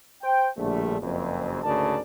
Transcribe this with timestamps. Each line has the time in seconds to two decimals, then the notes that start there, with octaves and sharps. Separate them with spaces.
0.22 C5 G5
0.56 A#1 A2 D3 F3 G3 A3
1.00 F#1 F2
1.63 D2 G#2 C#3 A#4 D5 A5